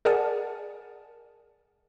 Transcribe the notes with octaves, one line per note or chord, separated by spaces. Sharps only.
G#4 A#4 D5 F#5 G#5 A5